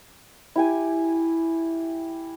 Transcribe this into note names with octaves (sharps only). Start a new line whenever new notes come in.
E4 G4 G#5